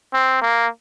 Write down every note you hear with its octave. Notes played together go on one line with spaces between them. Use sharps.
C4
A#3